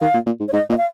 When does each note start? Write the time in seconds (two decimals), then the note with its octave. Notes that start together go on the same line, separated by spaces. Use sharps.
0.01 D#3 F5
0.14 A#2
0.26 A#2
0.40 G#2
0.48 C#5
0.53 G#2 D#5
0.70 A#2 D#5
0.78 F5